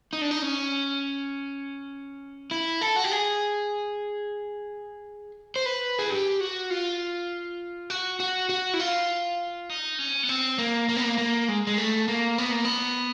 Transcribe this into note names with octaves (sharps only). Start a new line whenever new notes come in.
D#4
D4
D#4
C#4
E4
A4
F#4
G4
G#4
C5
B4
G#4
G4
F#4
F4
F#4
F#4
F#4
E4
F4
D#4
C#4
B3
C4
A#3
A#3
B3
A#3
A#3
G#3
G#3
A3
A#3
B3
A#3
B3